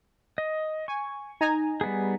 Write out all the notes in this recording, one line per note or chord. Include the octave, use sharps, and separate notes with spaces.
D#5
G#5 C#6
D#4 G#5 A#5
G3 B3 G#4